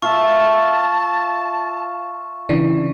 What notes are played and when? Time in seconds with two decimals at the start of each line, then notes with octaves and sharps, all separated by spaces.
0.02 F4 E5 F5 A5 C#6
2.49 C#3 E3 D4